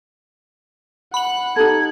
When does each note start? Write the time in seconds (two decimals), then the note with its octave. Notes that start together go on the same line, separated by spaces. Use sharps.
1.14 F#5 B5 F#7
1.56 D#4 G4 A4 G#6